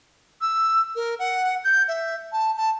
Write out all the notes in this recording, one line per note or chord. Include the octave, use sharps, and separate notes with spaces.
E6
A#4
F#5
G6
E5
A5
A5